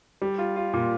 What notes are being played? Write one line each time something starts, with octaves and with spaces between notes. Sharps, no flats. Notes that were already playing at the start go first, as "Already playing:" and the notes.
G3
F4
F4
A#2